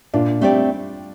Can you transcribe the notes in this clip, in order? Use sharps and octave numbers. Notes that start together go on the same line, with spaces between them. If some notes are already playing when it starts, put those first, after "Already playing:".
A#2 D4 F4
G3 A3 C4 G4 D5